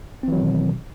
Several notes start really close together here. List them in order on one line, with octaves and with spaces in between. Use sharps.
C4 E3 F#3 D#3 B2